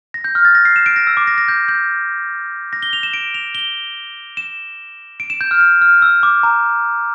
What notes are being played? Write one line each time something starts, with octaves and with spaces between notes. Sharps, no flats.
A#6
G6
F6
A6
A#6
C7
E7
D7
A#6
E6
D6
A#6
A#6
G6
G6
A#6
G7
F7
E7
D7
F7
G7
E7
D7
E7
G6
F6
G6
F6
E6
D6
A#5